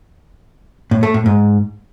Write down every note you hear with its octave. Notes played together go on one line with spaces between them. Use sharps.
A2
A3
A2
G#2